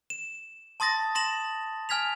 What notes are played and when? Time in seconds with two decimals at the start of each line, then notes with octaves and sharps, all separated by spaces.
0.10 E7
0.80 A5 C6 D#6 A6 A#6
1.15 C6 A#6 E7 F#7
1.89 G#5 F6 G#6 B6 F7